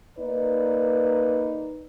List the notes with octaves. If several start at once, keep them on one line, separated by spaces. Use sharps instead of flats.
A#3 D#4 B4 D5